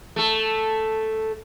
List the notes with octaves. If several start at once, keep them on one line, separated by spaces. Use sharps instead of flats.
A3 A4